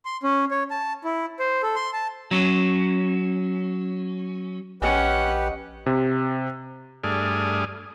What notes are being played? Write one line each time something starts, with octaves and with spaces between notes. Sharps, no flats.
C6
C#4
C#5
A5
E4
C5
A4
C6
A5
F#3 C#4
A#1 C#4 G4 B4 C#5 D#5 F#5 G#5
C3
G2 A3 G#4 D5 D#6 F6